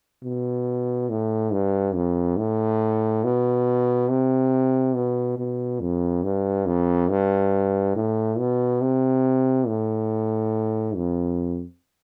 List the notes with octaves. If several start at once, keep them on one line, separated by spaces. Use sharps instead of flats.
B2
A2
G2
F2
A2
B2
C3
B2
B2
F2
G2
F2
G2
A2
B2
C3
A2
F2